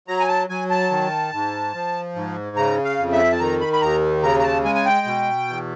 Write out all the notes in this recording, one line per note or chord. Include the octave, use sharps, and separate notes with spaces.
F#3 A#5
G#5
A5
F#3 G#5
A5
D#3
G#2
F3
G#2
C#3 A#5
F5
F2
E5
A5
D#3 A#5
B5
B5
D#2 A#5
C#3 A#5
A#5
A5
G#3 G#5
G#5
G5
B2
E2